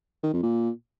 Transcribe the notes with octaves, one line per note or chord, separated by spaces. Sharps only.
D#3
F2
A#2